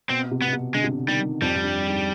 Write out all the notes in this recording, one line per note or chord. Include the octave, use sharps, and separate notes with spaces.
B2 C4
C3
B3
B2
C3
D3 G#3
C3
D3
D#3 G3
F2 G3
F2
G2
G#2